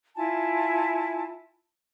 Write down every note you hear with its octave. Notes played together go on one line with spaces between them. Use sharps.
E4 F4 G#5 A5